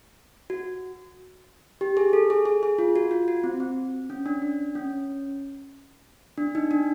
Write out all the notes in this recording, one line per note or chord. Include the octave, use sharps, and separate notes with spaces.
F#4
G4
G#4
A4
G#4
G#4
G#4
F4
F#4
F4
F#4
C4
C4
C#4
D4
D4
C#4
D4
D#4
D4